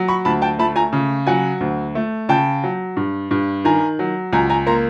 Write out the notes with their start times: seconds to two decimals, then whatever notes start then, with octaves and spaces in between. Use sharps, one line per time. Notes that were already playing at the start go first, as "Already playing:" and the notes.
Already playing: F#3
0.08 B5 C#6
0.25 D2 A5 B5
0.42 G5 A5
0.59 A3 A5 B5
0.76 G#5 A#5
0.93 C#3
1.27 F#3 F#5 G#5
1.60 D2
1.95 A3
2.29 C#3 G5 A5
2.64 F#3
2.97 G2
3.31 G2
3.64 D#3 G#5 A#5
3.99 F#3
4.33 C#2 G#5 A#5
4.50 G#5 A#5
4.67 A#3 A#5 C6